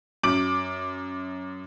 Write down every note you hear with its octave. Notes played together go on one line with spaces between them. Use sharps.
F#2 D6 D7 F#7